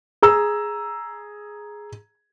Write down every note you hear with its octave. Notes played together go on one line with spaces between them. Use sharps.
G#4 A#5 E6